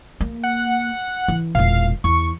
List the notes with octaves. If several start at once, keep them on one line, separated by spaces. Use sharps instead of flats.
A#3
F#5
E3
E1 A#2 F5
E2 C#6